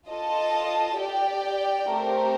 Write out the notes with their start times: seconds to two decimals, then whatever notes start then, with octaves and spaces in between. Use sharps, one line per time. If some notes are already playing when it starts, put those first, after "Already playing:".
0.09 F4 A4 D#5 A5
0.99 G4 D5 G5
1.90 A3 C4 G4 A#4